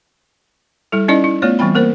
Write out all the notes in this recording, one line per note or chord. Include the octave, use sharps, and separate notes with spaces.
G3 E4 A4
C#4 D#4 E4 D5 D#5
E4
A3 B3 F4 C#5 D5
E3 G3 C4 G5 B5
A#3 A#4 C5